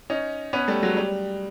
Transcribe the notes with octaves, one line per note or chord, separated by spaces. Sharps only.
C#4 D#4
B3 C#4
G3 A3
F#3 G#3
G3